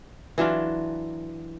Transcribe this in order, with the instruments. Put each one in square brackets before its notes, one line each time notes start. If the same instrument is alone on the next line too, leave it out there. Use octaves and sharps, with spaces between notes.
[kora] E3 F#3 D4 F4